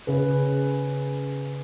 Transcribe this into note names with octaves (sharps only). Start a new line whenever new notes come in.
C#3 G#4 B4